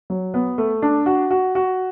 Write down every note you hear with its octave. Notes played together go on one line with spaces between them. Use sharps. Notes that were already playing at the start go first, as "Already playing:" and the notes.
F#3
B3
A3
D4
F#4
F#4
F#4